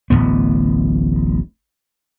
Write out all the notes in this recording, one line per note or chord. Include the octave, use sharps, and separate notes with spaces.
D1 A1 D#2 B3